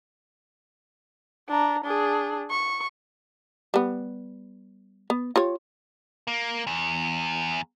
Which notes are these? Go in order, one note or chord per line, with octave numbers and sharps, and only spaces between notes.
D4 A#5
D4 G#4
C#6
G3 B3
B3
F4 G4 C#5
A#3
E2